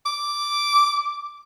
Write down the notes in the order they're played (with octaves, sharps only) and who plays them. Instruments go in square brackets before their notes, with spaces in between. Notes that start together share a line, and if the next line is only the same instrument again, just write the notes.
[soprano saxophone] D6